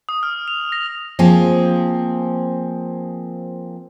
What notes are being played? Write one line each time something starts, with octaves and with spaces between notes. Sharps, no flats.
D#6
F6
F7
A#6
F3 A#3 C4 G#4